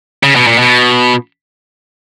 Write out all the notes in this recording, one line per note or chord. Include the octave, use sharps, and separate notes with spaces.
C#3
B2
A#2
B2